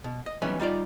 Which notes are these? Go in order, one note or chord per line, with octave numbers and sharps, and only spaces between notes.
B2
D#5
E3 F#3 G3 B3 C#4 D#4
G3 D#4 F4 D5